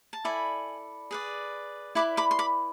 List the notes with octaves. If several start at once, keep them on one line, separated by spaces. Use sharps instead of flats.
A5
E4 A4 D5 G#5 B5
G#4 B4 D5
E4 B4 D5 B5 D6
B5 D6
C6
B5 D6